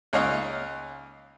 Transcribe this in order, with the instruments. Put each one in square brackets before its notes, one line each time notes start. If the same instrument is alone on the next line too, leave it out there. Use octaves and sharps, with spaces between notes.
[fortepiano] C#2 A#3 D#4 C#5 D#5 F5